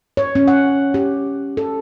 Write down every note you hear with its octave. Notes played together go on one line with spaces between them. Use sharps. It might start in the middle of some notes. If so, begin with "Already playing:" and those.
C#5
C#4
F#5
G4
A4